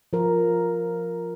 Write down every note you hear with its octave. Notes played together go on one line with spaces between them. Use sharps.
F3 A#4